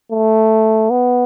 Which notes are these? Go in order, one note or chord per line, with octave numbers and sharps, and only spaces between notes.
A3
B3